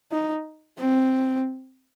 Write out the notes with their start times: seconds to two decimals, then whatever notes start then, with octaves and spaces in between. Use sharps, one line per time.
0.12 D#4
0.78 C4